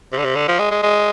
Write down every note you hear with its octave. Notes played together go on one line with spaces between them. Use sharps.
C3
D3
C3
D3
F3
G#3
G#3
G#3